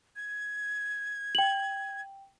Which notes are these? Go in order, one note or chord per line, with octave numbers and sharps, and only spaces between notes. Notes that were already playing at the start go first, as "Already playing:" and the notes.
G#6
G5 F#7